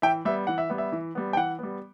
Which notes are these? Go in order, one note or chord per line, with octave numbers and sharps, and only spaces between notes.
E3 E5 G5
G3 B3 E5
E3 F#5
E5
G3 B3
E5
E3
G3 B3
G5
E3 F#5
G3 B3